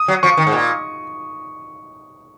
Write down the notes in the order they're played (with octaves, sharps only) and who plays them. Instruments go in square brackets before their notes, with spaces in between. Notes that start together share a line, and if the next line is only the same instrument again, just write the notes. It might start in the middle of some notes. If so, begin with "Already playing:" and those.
Already playing: [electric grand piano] D#6
[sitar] F#3
[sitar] F3 [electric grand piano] C#6
[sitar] D#3
G#2
A#2